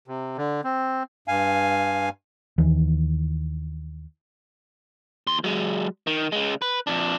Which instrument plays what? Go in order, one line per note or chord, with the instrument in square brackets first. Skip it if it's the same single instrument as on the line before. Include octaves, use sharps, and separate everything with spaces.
[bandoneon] C3
D3
C4
G2 F5 G#5
[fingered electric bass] D#2 D#3 E3
[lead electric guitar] D#2 C6
F#3 G#3
D#3
C#3 G#3
B4
F2 D4